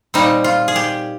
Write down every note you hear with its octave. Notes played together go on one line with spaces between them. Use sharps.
A#2 G3 C4 D#4
F4
G#4
G4